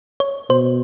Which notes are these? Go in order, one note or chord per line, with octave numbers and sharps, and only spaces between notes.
C#5
B2 C5